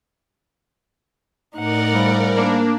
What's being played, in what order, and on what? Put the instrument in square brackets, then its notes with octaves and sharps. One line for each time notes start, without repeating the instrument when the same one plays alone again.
[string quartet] A2 D#4 F#5 [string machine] A#4 D5
[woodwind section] C#3 F3 G3
[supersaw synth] A#3 D4